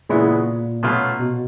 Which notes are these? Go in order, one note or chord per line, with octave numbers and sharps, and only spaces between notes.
A#2 C#3 E3 G#3 B3 E4
B2 F#3 A3 C#4 F4
B2